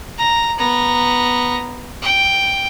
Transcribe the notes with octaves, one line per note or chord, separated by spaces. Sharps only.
A#5
B3 A#5
G5